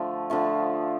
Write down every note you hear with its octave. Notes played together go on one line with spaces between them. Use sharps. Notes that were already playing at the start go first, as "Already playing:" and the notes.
Already playing: D3 F3 A3
D3 F3 A3